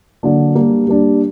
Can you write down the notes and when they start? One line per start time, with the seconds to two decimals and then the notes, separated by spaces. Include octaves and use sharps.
0.23 D3 F#3 A#3 D4
0.55 G3 A#3 D4
0.87 G3 A#3 D4